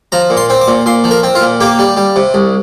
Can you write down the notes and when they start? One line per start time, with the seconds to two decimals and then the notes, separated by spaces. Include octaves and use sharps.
0.12 F3 A#5
0.30 A#2
0.37 C6
0.50 C4
0.61 D6
0.68 A#2
0.86 A#2 C6
1.04 F3
1.11 A#4
1.23 C4
1.35 F4
1.41 A#2
1.61 A#3 G4
1.79 G3
1.97 G3
2.16 C3
2.34 C2